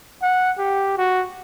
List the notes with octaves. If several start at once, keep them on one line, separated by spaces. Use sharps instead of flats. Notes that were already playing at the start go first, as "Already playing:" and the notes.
F#5
G4
F#4